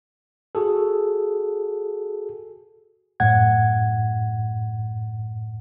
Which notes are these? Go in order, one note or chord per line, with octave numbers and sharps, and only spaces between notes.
F#4 G#4 A4
F#2 A2 F#5 G#6